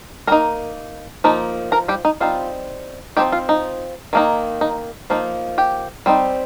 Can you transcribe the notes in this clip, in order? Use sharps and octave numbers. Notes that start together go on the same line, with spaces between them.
G3 A#3 D#4 A#4 A#5
F3 A#3 D#4
A#4 A#5
G3 G4
D#4
G3 C4 D#4 F4
F3 G3 C4 D#4 G4
F4
D#4
D#3 A#3 D#4
D#4
F3 A#3 D#4
G4 G5
G3 C4 D#4